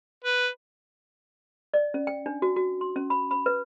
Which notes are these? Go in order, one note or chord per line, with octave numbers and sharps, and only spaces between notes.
B4
D5
C#4
G5
D4
F#4
F#4
C6
C#4
B5
B5
B4